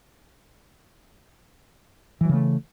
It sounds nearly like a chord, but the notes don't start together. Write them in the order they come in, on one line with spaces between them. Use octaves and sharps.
E3 F#3 C#3 A3